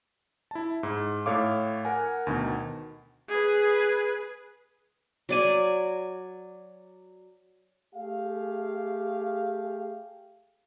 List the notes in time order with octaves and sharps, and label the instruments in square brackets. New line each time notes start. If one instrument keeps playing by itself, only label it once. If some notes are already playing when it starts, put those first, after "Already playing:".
[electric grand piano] E4 A5
G#2
A2 A4 C#5 F5 D6
A#4 F#5 G#5
D2 B2 D#3
[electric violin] G#4 B4
[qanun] F#3 D5 G#5
[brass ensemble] A3 G4 G#4 F5